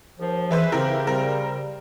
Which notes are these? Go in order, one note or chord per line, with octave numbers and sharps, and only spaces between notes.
D#2 F3
E3 G#4 B4 C5 E5
C#3 C4 E4 G4 A#4
G3 C4 A#4